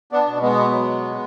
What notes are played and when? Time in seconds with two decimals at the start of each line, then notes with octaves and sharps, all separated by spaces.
0.12 B3 D4
0.27 B2
0.42 G#3 B3
0.72 F#3